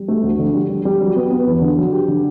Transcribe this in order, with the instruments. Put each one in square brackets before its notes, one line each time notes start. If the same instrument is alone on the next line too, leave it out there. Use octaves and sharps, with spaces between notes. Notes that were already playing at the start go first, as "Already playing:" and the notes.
Already playing: [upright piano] G3
A3
D2
D3
G3
G3
G3
F#3
B3
B3
E2
D3
F#3
G4
D3